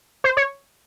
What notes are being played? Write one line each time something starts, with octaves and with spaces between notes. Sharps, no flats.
C5
C#5